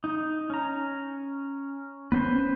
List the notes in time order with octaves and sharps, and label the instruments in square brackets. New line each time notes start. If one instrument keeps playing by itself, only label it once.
[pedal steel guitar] D#4
C#4 A#5
[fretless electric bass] B3 C#4 [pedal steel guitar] B4 C5